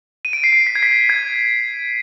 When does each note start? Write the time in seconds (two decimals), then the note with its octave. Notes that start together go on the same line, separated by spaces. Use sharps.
0.25 D#7
0.33 D7
0.44 C7
0.52 D7
0.67 B6
0.75 G#6
0.83 B6
1.09 G#6